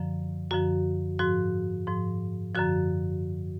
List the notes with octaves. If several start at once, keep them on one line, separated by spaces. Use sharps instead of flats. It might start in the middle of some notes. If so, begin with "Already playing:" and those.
Already playing: F#2 D3 F3
F#2 D3 F3 F#4
G#2 F3 F#4
G#2 F3
F#2 D3 F3 F#4